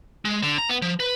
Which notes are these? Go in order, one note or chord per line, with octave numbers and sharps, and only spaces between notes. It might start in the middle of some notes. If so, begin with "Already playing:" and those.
G#3
D3
A#5
B3
F3
B4